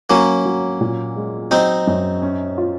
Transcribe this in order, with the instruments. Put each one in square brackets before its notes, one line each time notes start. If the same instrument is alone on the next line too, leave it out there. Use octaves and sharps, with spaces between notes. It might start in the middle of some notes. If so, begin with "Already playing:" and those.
[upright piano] F#3 [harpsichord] A#3 C#4
[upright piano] F#3
A#2
G#3
[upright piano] F#3 [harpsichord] C4 D#4
[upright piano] F#2
C#4
F4